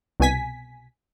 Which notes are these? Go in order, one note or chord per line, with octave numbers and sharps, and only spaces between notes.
C2 B2 G#5 B6